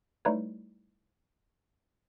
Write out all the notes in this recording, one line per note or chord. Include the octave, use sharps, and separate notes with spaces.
G3 A3 D#4 E4 B4 C#5